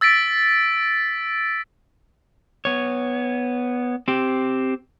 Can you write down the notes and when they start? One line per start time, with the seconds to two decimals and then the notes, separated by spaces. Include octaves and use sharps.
0.01 E6 A6 B6 D7
2.65 B3 C#5
4.08 C4 G4